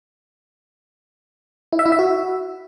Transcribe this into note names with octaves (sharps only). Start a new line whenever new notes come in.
E4
E5
E4
E5
F#4